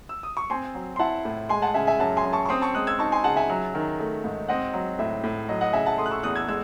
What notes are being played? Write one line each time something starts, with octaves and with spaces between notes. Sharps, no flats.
E6
D#6
C#6
C4 G#5 C6
F#3
C6
E4 F#5 A5
A2
G#3 G#5 C6
F#5 A5
C#3 E5 G#5
E5 G#5
F#2 F#5 A5
G#5 C6
F#2
A5 C#6
C#6
C4 C6 D#6
A5 C#6
G#3 D#6 F#6
E6 G#6
D#4 A5 C#6
G#5 C6
C#3 F#5 A5
E5 G#5
F#3
D#3
A3
G#2
C4 D#5 F#5
F#3
A2 E5
A2
F#3 D#5
D#5 F#5
C#3 E5 G#5
F#5 A5
A3 C6 D#6
F#6
C#6 E6
E2 D#6 F#6
E6 G#6
G#3 E6 G#6